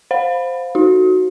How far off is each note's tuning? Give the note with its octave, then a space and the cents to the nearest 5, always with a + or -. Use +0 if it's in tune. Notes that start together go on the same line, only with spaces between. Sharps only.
C5 +0 F5 +15 B5 +0
D#4 +0 F#4 +0